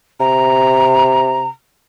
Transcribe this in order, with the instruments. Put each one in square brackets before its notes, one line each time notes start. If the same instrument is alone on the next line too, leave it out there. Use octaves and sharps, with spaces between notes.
[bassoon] C3 [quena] A#5